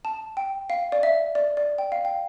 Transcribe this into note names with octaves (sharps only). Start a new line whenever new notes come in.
A5
G5
F5
D5
E5
D5
D5
G5
F5
G5